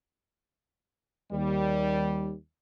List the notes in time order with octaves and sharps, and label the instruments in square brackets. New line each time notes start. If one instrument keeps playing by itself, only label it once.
[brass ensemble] D#2 G3